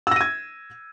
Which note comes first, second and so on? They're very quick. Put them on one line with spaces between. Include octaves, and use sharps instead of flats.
E6 A#6 D#7 G#6